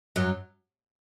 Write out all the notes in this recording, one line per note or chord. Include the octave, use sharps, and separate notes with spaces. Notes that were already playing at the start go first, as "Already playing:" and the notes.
F#2 F#3